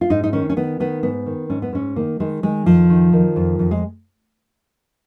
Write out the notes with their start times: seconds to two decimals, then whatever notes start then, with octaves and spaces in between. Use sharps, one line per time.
0.01 F4
0.10 G#2 D#4
0.23 D#4
0.33 D#3 C#4
0.50 C#4
0.56 D#3 B3
0.80 D#3 B3
1.03 G#2 B3
1.26 D#3
1.49 G#2 C#4
1.62 B3
1.73 G#2 C#4
1.96 D#3 A#3
2.20 D#3 G#3
2.43 D#3 G#3
2.66 F2 F3
2.90 D#3
3.13 D#3
3.36 F2
3.59 F2
3.71 G#3